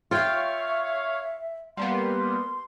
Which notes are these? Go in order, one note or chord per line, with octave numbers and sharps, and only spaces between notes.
F4 C#5 E5 F5 G5
G3 A#3 B3 C6